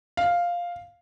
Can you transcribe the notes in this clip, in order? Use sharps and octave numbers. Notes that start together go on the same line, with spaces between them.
F5